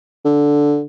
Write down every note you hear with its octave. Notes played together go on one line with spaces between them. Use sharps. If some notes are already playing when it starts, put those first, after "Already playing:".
D3